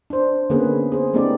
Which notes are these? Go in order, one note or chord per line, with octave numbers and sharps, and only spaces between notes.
D4 C5
D3 A#3 B3 C#4 G#4 B4
G#4 C5
A3 B3 C#4 D#4 G4 D5